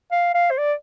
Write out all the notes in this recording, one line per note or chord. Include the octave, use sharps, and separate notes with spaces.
F5
F5
C5
D5